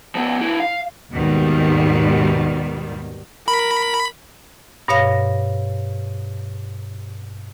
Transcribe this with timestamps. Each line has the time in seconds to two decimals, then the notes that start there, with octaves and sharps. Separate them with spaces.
0.15 F3 B3
0.40 F3 E4
0.60 F5
1.14 D#2 G#2 B2 D#3 G3
3.48 A#4 B5
4.88 G2 B2 C#5 F5 A#6